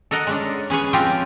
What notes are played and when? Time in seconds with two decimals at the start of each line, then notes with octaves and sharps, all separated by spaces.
0.11 A4 A#4 D#5 F#5
0.27 G#3 C#4 D4
0.70 C#4 G#4 B4 C#5
0.93 F3 C4 C#4 F4 G4